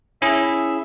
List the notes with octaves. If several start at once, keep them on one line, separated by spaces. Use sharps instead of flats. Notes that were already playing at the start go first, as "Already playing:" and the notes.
C#4 E4 G#4 E5